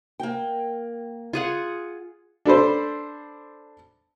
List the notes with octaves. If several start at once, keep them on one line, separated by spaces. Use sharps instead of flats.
A#3 G5
F4 G#4 F#5
D4 A4 B4 C5